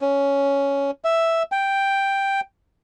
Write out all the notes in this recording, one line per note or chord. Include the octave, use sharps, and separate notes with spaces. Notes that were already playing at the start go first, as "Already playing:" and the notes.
C#4
E5
G5